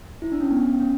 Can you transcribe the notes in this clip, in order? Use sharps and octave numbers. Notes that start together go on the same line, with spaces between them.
E4
D4
C#4
B3
C#4